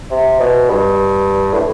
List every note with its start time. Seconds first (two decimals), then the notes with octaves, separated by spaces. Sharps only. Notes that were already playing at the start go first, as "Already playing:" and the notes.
0.11 C3
0.40 B2
0.70 G2
1.53 A2